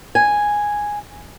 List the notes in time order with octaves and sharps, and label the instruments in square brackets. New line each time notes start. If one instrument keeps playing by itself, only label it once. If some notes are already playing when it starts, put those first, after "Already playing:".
[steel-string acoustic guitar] G#5